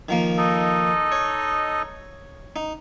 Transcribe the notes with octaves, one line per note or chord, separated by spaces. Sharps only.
D#3 F3 A#3
D#4 A4 D#5
C#5
D#4